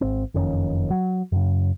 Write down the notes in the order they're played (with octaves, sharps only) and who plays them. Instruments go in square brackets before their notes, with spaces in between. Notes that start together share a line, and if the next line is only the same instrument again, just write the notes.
[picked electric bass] G#1 C4
F#1 F2 D#3 C#4
F#3
F#2 C#3